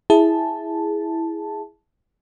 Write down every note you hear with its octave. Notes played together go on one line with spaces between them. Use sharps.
E4 G#4 A5